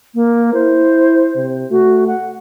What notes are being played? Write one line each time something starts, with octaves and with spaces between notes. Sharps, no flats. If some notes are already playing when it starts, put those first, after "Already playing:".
A#3
E4 C5
C3
A3 F#4
F#5